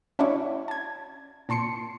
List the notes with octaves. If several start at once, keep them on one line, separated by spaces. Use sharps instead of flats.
C#4 D4 E4 F#4 C#5 D5
A5 G#6
A#2 A5 C6 C7 C#7